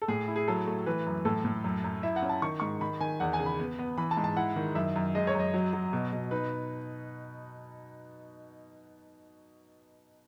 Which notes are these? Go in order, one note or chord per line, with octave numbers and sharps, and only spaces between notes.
A4
A2 G#4
E4
G#4
F#3 A4
A3
E3 B4
F#2
A2 A4
A2
F#2
F#2
E4 E5
F#5
C#4
A5
D#3 C#6
G#2 C#6
D#3 B5
D#3 G#5
E2 F#5
G#5
C#3
B5
B3
B3
E3 B5
A5
G#2
A5
E4 F#5
D#3
F#2 E5
F#2
G#3 D#5
C#5
F#2 D#5
F#3
F#3
B2
B2
D#4 B4